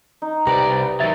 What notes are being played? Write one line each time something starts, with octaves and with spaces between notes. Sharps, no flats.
D#4
C2 G4 B4 D5 A#5
D#3 F#3 E5 A6